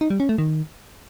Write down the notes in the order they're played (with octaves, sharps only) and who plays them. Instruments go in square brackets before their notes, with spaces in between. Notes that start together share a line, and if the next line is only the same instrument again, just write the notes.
[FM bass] D#4
G3
C#4
A3
D#3